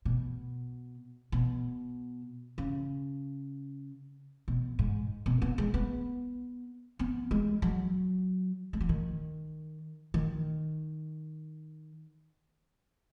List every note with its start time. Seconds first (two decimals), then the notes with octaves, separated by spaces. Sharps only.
0.05 B2
1.32 B2
2.58 C#3
4.48 B2
4.79 G#2
5.26 B2
5.42 B3
5.58 G#3
5.74 B3
6.99 B3
7.31 G#3
7.62 F#3
8.73 G#3
8.80 F#3
8.89 D#3
10.14 D#3